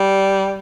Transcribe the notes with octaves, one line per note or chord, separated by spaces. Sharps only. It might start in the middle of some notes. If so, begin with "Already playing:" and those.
Already playing: G3